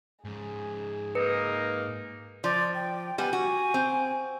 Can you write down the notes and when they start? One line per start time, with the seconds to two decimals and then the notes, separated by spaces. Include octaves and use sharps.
0.25 G#2 C#4 G#4
1.15 A#3 D#4 B4
2.44 F3 D5
2.75 G5
3.18 G3 B3 G#5
3.33 F#4
3.74 C4